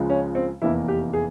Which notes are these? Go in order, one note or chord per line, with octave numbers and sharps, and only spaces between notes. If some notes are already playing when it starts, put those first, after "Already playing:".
Already playing: C#2 C#3 F3 G#3
C#4
C4
F1 E2 E3 A#3 E4
G4
G#4